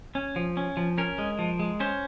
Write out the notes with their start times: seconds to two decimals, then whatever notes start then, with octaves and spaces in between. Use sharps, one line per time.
0.15 C#4
0.36 F3
0.57 C#4
0.77 F3
0.98 C#4 A#4
1.18 G#3
1.39 F3
1.59 G#3
1.80 C#4 C5